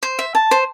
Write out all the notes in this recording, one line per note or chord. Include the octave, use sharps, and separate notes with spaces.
C5
E5
A5
C5